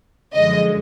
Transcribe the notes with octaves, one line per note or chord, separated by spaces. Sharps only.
F#2 D3 F3 G#3 D#5